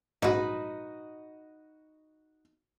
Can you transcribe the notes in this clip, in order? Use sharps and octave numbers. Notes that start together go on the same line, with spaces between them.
A#1 G#2 D#4 F#4 B4 D#5